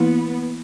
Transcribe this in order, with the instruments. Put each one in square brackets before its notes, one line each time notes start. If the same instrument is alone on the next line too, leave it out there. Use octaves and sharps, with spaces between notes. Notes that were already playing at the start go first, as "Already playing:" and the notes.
Already playing: [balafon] E3 A#3 E4 [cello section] B3